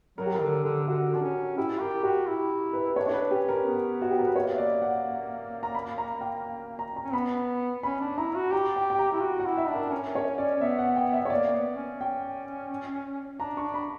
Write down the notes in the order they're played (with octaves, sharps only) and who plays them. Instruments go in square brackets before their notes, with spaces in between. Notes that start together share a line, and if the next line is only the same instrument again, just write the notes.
[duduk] F#3 [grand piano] A#4
[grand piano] G4
A#4
[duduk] D3
D3
[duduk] D3 [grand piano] F#4
[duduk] D4
C#4
[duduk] E4 [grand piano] G4
[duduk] G4 [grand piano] A#4
[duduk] F#4 [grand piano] G4
[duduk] E4
[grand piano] B4
[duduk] D4 [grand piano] C#5
[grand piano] C#5
B4
[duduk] C#4 [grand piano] G4
[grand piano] A#4
[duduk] B3
[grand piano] F#4
G4
A#4
B4
[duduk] A#3 [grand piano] C#5
[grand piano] E5
D5
F#5
A#5
B5
A#5
G5
A#5
A#5
[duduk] C#4
[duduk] B3 [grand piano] B5
[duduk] C#4 [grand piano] B5
[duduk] D4
[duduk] E4 [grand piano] A#5
[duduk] F#4
[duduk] G4 [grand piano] A#5
[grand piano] G5
G5
A#5
[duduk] E4
F#4
[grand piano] F#5
[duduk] E4
[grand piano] E5
[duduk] D4
[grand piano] A#4
[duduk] C#4 [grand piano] A#4
[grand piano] C#5
D5
[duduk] C#4
[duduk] B3 [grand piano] E5
[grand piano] F#5
G5
E5
C#5
[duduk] A#3 [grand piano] D5
[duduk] B3
C#4
[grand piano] G5
[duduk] D4 [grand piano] A#5
[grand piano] C#6
[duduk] D4
[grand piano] B5